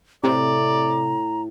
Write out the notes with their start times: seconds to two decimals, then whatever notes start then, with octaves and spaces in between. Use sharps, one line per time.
0.23 A2 C3 D5 A#5